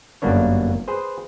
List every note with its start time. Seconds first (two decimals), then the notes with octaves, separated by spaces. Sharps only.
0.22 G1 F#2 A#3 B3 D4 C#5
0.88 G#4 B4 C5